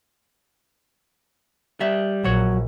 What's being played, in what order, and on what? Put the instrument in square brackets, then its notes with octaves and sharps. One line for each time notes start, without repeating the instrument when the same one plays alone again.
[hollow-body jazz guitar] G3 E5
[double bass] A#1 [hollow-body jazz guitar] F#3 C#5